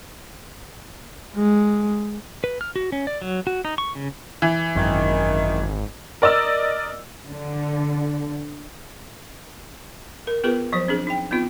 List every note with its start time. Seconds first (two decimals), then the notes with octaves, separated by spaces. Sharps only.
1.35 G#3
2.44 B4
2.61 F6
2.76 F#4
2.92 C#4
3.07 D5
3.22 F#3
3.47 F#4
3.65 D#4
3.78 C#6
3.95 C#3
4.42 E3
4.75 G#1 F#2 D#3
6.22 A#4 D5 D#5 E6
7.29 D3
10.27 A#4
10.44 B3 F4 G#4 A#4 B4
10.73 F3 F#3 C5
10.88 C4 D4 G#4
11.07 D#4 G5
11.31 B3 C4 D#4 F4